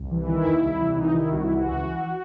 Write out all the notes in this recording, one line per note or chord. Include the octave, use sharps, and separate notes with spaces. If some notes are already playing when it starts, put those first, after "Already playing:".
Already playing: C2
E3
D#3 E4
D#2
C2
E3
C2 D#4
D#3 E4
C2 F#4
E4
E3
F#4
C#2
E3